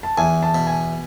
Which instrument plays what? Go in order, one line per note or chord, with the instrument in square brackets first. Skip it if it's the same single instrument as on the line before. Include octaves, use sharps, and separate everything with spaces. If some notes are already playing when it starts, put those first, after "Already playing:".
[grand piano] A5
[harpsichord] E2 [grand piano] G#5
[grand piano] A5
[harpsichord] B2
[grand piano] G#5